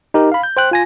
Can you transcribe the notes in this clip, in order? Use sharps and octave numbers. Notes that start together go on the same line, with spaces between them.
D#4 G4 A#4
F5 B5
G6
C5 G5 F#6
F4 G#5 A#6